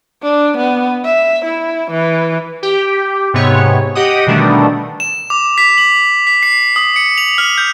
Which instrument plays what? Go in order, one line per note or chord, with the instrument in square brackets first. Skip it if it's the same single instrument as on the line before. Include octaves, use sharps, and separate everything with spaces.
[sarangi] D4
B3
E5
E4
E3
[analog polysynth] G4
G#2 C3 B3 C#5
G4 D#5 F#5 D#6
B2 D3 D#3 G3 A3 D4
[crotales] E7
D6
B6
F#7
B6
C7
D#6
C#7
F7
F6
G6